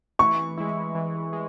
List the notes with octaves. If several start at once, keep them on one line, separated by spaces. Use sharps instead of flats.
E3 C#6
G#3 E4
E3
G#3